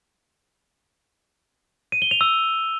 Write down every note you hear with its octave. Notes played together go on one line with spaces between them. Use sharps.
D#7
G7
F7
E6